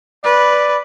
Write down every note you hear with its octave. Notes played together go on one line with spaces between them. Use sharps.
B4 D5